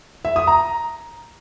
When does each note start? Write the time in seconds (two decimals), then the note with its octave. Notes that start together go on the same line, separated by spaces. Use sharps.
0.25 E5
0.36 D#6
0.47 A#5